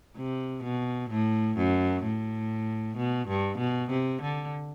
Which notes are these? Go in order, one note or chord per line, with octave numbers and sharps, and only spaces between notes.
C3
B2
A2
F#2
A2
B2
G2
B2
C3
D3